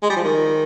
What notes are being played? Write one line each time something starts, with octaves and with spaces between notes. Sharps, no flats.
G#3
G3
F3
D#3